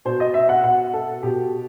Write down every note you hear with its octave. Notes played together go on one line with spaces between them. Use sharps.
B2 C5
D#5
E5
F#5
B2 F#5
A4
B2 G4